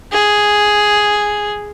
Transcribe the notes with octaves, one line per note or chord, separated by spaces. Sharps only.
G#4